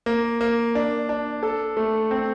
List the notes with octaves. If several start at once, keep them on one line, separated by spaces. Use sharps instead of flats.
A#3
A#3
D4
D4
A4
A3
C4